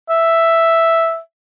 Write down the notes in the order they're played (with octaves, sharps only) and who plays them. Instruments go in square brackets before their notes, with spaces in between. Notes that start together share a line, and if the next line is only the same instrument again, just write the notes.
[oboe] E5